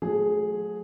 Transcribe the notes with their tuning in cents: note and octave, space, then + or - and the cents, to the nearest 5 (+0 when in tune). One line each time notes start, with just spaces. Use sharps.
F#3 -35 A3 -25 G#4 +0